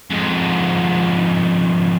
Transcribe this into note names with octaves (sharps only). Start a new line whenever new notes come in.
F2 G#2